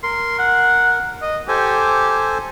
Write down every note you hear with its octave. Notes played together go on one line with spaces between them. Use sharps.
A#4 C6
F#5
D#5
G4 A4 C5 G#5